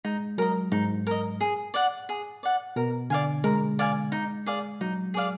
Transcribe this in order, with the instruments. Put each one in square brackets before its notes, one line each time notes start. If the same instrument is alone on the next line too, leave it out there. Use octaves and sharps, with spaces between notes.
[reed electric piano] G#3 [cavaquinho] D#4
[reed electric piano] F#3 [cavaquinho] A#4 D#5
[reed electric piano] G#2 [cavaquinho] D#4
[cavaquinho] A#4 D#5
G#4
D5 F#5
G#4
D5 F#5
[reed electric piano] B2 [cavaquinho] A#4
[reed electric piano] D3 [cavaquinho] D5 F5 G#5
[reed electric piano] G#3 [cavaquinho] A#4
[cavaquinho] D5 F5 G#5
D#4
G#4 D5 F5
[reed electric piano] F#3 [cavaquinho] D#4
[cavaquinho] G#4 D5 F5